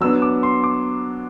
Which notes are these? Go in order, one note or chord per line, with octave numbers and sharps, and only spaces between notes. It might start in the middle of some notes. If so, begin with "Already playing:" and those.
F#3 B3 D4 E6
D6
C6
D6